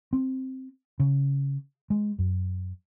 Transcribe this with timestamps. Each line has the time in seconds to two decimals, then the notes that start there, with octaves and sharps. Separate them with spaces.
0.13 C4
1.00 C#3
1.90 G#3
2.19 F#2